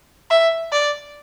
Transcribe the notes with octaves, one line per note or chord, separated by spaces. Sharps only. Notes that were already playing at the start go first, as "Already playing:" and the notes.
E5
D5